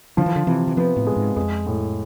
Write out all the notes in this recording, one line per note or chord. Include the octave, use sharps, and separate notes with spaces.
D3 F3
E3
D3
C3 E3
E3
F3 B3
A2
G#3
G#2
F2 G#3
A2